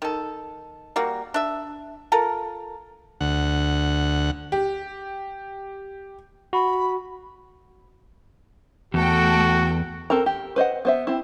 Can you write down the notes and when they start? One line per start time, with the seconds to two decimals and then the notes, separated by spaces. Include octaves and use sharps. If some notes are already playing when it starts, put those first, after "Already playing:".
0.02 D#3 A4
0.96 G3 A#3 F#4
1.34 D4 E5
2.12 F4 A4 A#4
3.21 D2 F#5
4.52 G4
6.53 F#4 B5
8.94 E2 A3 F#4 A4 G5
10.10 C4 A4 A#4 A#5
10.26 G4
10.56 B4 C5 D#5 F#5
10.85 B3 C5 E5
11.07 C4 E4